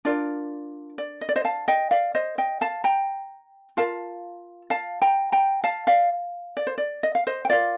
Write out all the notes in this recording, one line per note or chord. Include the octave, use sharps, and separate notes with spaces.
D4 F4 A#4 D5
D5
D#5
D5
C5 D#5
F5 A5
D#5 G5
D5 F5
C5 D#5
D#5 G5
F5 A5
G5 A#5
F4 A#4 F5 A5
F5 A5
G5 A#5
G5 A#5
F5 A5
D5 F5
D5
C5
D5
D#5
F5
C5 D#5
G5
F4 A#4 D5 F5